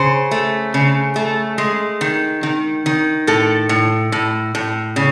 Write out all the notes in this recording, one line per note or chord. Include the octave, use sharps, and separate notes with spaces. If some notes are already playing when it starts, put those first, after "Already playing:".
Already playing: C#3 C5
A3
C#3
A3
G#3
D#3
D#3
D#3
A2 A4
A2
A2
A2
C#3